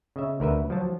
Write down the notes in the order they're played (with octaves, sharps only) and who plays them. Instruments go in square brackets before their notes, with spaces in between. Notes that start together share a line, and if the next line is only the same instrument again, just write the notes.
[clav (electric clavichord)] C#3 D#5 E5
D2 A#4 B4 E5
F3 F#3 A5